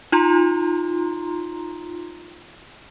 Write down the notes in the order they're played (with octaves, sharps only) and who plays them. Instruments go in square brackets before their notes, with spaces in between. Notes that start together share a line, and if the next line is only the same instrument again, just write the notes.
[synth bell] D#4 F4 A#5 C6